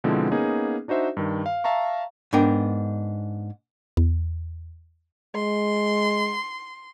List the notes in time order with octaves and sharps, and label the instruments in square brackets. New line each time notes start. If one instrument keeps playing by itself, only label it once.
[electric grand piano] B2 D3 F3 G#3 C4 E4
A#3 B3 C#4 D#4 G#4
D4 D#4 F#4 C5 E5
G2 D#3
F5
E5 F5 A5 A#5 C#6
[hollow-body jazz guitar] G#2 B3 D4 A#4 G5
[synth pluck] E2
[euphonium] G#3 [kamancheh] C6